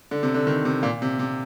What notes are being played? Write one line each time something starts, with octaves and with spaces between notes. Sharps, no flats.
D3
C3
D3
D#3
C3
A#2
C3
C3